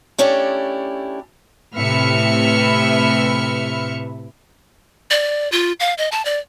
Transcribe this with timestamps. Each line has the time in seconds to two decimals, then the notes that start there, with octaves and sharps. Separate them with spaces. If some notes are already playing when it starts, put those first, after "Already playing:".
0.18 A3 C#4 D4 E4 G4
1.76 A2 C3 B4 E5 F6 C#7
5.11 D5
5.52 F4
5.80 F5
5.98 D#5
6.12 A5
6.25 D5